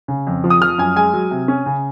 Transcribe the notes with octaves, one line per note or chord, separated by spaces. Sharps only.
C#3
F2
F3
D#6
F3 F6
F#2 G#5
G#3 G#5
F#3
C3
C#4
C#3